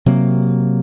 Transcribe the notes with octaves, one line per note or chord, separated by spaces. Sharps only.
C3 F#3 A#3